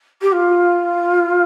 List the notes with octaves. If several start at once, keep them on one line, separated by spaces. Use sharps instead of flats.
G4
F4